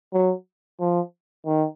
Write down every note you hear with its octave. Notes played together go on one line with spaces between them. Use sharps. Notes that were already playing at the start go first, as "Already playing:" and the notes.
F#3
F3
D#3